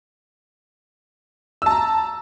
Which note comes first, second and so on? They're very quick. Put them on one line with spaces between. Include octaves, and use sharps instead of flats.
E6 A5 A#5